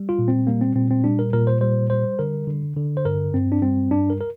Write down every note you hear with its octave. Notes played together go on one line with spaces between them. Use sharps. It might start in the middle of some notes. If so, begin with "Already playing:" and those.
Already playing: G3
F4
A#2
C4
G3 A#3
C4
A#2 C4
C4
G3 D4
A#4
A#2 A#4
C5
G3 C5
G3 C5
D3 A#4
D3
D3
C5
G2 A#4
G2 C4
D4
G3 C4
G2 D4
A#4
A#4